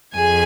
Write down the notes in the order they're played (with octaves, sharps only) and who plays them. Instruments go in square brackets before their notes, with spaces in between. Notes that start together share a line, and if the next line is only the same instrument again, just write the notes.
[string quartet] F2 G#4 G#5